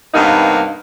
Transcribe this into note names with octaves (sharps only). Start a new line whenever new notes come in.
G2 C3 A#3 B3 D#4